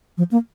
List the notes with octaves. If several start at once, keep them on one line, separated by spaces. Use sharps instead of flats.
F3
A#3